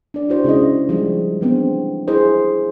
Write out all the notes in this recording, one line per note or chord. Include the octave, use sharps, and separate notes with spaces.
D4 D5
E4 F#4 C5
C#3 G#3 E4 D#5
F3 G3 G#3
E3 G#3 B3 C4 D4
E4 G#4 C5 D#5